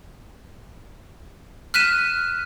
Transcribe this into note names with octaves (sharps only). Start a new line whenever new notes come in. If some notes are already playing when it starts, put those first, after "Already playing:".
F6 F#6 B6 D#7 E7